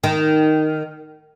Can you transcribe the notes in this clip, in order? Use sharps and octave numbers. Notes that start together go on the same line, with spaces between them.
D#3